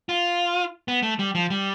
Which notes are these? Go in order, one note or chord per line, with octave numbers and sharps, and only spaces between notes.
F4
B3
A3
G3
F3
G3